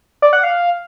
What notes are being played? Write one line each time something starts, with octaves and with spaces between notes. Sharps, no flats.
D5
F#5
F5